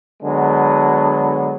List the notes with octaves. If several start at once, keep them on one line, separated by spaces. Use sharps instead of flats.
D3 F#3 G#3 B3